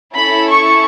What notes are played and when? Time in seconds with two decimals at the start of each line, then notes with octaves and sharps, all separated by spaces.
0.13 C#4 E4 A4 B5
0.47 C#6